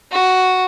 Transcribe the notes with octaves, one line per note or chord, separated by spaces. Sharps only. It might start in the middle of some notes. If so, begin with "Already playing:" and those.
F#4